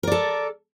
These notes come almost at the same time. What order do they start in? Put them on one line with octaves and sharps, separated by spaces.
A#4 D5 A4